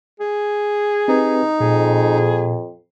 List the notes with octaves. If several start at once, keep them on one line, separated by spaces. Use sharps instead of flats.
G#4
C4 D#4 G4 B4
F2 A#2 G#4